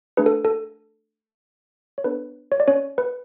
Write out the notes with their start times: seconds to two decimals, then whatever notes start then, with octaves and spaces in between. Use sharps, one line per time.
0.17 A3 D4 G#4 B4
0.26 A4
0.45 A4
1.98 C#5
2.04 B3 D4 A4 B4
2.52 C#5
2.60 D5
2.68 C#4 C#5
2.98 B4